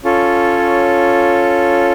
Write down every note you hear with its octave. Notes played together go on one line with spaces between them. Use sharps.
C#4 F4 A4 C#5